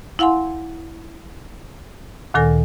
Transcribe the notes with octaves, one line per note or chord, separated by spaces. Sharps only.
E4 F5 F#5 G#5 C6
D2 A#2 D#3 A4 G#5 A#6